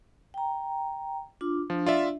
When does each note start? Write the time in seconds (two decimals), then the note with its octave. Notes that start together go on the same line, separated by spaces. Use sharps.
0.34 G5 A#5
1.41 D4 F4 D6
1.70 F3 D4
1.86 F4 D5 E5